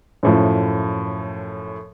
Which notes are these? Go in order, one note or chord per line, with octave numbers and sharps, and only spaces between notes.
F#2 A2 F3